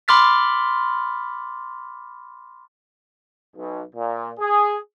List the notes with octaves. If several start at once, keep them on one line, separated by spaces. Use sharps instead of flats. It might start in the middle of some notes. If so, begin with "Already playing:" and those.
B5 C6 D6 F6 A6 B6
B1
A#2
G#4